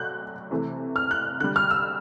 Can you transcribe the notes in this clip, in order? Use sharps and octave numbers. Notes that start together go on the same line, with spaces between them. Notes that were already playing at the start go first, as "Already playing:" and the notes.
Already playing: F#3 A3 F#6 G6
C3 E3 A3
F6
F#6
D3 G3 F#6
F6
E6